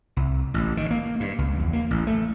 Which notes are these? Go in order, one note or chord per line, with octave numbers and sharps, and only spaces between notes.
C2
A1
D#3
A#3
G2
C#2
E2
A#3
A1
A3